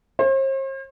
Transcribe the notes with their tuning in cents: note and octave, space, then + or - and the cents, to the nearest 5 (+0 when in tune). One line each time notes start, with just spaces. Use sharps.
C5 +45